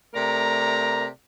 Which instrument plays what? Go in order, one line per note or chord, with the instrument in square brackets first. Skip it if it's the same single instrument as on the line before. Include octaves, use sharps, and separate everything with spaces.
[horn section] C3 A3 A#4 D5 A#5